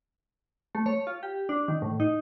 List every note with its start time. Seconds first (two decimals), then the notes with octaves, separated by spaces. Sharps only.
0.75 A3
0.86 C#5
1.07 F4
1.23 G4
1.49 D4
1.68 D#3
1.82 A2
2.00 D#4